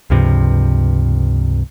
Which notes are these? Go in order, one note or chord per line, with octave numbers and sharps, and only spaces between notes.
C#2 G2 C3 F3